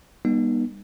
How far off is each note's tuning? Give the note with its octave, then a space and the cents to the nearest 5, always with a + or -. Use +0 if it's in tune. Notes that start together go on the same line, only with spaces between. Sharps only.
G3 +25 B3 -40 D#4 -25